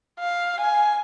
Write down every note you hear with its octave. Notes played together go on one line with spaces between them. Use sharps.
F5
G#5